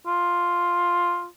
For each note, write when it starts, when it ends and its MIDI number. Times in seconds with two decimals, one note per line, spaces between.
0.07 1.27 65